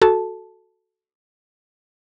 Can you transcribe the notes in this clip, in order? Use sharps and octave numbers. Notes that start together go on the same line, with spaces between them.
F#4 A4 A5